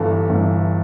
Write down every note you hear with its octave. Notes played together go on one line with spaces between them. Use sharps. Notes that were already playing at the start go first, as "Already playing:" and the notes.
Already playing: G1 G2 E3 A4
G1 G2 E3